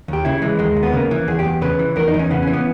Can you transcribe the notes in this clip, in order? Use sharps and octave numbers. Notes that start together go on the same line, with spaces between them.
D#2 G4
C#3 E4
E3 G#3
D#2 G#3
D#2
B3
C#3 A#3
E3
E2 G#4
G4
E2
C#3 B4
E3
E2 A#4
D#4
E2
C#4
C#3 B3
E3 C#4
B3